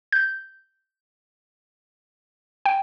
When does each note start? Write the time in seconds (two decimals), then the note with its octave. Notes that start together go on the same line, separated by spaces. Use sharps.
0.12 G6
2.65 G5